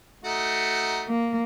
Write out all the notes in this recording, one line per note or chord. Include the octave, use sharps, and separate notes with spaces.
A3 D#4 F#4
A#3